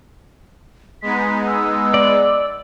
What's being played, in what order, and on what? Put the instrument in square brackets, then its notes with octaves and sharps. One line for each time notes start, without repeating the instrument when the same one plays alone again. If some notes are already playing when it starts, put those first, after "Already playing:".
[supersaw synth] G#3 B3 D#4 [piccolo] B6
[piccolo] E6
[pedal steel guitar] D5